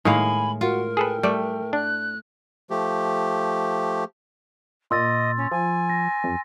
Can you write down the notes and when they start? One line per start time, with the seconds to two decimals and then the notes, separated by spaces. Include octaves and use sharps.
0.05 A2 D#3 G#3 A#3 F5 G#5 B5
0.61 F4 F#4 A#4
0.97 G#4 A4 B4 G5
1.23 G3 A3 D5
1.73 D4 F#6
2.70 F3 A3 G4
4.91 A#2 D#5 C6 E6 A6
5.37 C#4
5.52 F3 G#5
5.89 A#6
6.24 F2